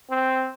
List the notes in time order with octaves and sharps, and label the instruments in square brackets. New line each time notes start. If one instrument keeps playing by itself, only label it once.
[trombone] C4